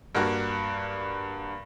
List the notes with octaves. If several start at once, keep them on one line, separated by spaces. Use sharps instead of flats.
G2 A#3 F#4